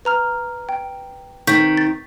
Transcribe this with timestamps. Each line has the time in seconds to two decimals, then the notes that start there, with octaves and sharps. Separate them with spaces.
0.05 B4 A#5 F6
0.69 G5
1.47 C3 D#3 C#6 G6 B6
1.77 A6